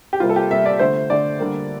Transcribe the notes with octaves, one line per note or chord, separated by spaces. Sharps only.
G4
C3 G3 A#3 F4
A4
G4
C3 G3 A#3 E5
D5
D3 A3 C5
D3 A3 D5
D3 G3 A#3